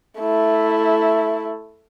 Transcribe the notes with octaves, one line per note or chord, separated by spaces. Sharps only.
A3 E4